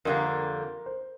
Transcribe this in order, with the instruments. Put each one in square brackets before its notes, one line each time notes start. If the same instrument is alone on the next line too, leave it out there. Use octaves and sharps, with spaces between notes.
[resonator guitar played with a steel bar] F2 D3 G3 A#3 [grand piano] A#4
[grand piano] C5